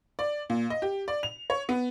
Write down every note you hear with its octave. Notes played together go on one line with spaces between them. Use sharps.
D5
A#2
D#5
G4
D5
F7
C#5
B3